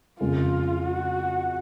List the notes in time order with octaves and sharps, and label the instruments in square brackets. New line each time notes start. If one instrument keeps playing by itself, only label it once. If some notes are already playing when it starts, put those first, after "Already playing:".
[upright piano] F2 C#3 G#3 [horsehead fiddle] F4
[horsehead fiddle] F#4